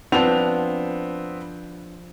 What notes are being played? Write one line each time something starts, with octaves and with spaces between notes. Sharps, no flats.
F3 B3 C4 D4 F7